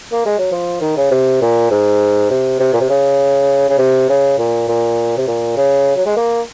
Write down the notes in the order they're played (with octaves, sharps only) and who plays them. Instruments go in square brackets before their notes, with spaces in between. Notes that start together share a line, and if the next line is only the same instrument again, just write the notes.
[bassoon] A#3
G#3
F#3
F3
D#3
C#3
C3
A#2
G#2
C3
C3
A#2
C3
C#3
C#3
C3
C#3
A#2
A#2
C3
A#2
C#3
F#3
G#3
A#3